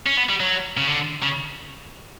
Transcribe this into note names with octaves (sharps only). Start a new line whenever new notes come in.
C#4
B3
G3
F#3
C#3
D3
C#3